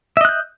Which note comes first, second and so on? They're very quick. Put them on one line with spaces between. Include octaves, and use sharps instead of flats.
E5 D#5 F#6 G6